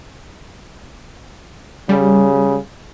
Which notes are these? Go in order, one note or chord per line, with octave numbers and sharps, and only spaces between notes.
C#3 G3